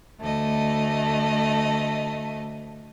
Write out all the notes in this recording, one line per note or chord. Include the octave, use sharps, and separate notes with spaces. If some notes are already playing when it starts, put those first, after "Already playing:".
D2 A3 D#5